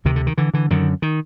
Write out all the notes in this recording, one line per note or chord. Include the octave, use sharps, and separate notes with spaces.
D2 C3 D#3
D3
D#3
D3 E3
D3 E3
F#2 D3 D#3
D#3